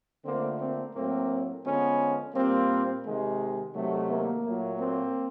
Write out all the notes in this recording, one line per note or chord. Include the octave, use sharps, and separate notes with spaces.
D3 F3 A3 A#3 C4
A#3 C4
A2 F#3 A3 A#3 C4
D3 F3 G#3 B3 C#4
A#2 G3 A#3 C4
C3 D#3 G#3
C3 D#3 F#3 A3
A#3
A#2 F#3 A3
A#3 C4